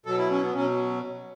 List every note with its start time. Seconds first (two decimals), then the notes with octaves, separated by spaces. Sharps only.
0.06 B2 F#3 A4
0.18 E4
0.31 C#4
0.43 B3
0.54 B2 F#3 C#4